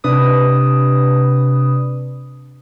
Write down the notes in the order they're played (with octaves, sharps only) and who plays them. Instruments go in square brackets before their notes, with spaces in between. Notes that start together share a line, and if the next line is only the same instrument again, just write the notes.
[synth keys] C3 D4 B4 D#6